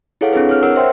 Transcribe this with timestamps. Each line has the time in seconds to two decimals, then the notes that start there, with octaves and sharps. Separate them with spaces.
0.21 E4 G#4 A4 C#5 F5 F#5
0.33 C4 D4 E4 G#4 B4
0.49 C#5 F6
0.63 A#4 C#5 F#5 E6
0.76 C5 C#5 E5 G5 C6